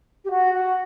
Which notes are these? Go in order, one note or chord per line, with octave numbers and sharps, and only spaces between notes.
G4
F#4
F#4